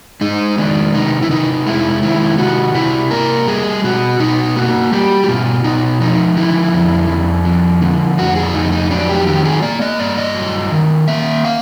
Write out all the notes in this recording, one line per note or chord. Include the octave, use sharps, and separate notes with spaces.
G#3 D#4
D#3 D4
C3 D#4
E4
C3 D#4
G#3 E4
D#3 E4
C3 F#4
C3 E4
A#3 A#4
G3 G#4
B2 F#4
B2 D#4
A#3 F#4
G3 G4
F#4
B2 F4
B2 D#4
F3 D#4
D3 E4
F2
F2
F3
D3
F2 F#4
G#4
F2 D#4
D#4
F#3 D4
G4
D#3 G4
G#4
A#3 D5
D#5
G2 D5
D#5
F#3
D#3
A#3 E5
F5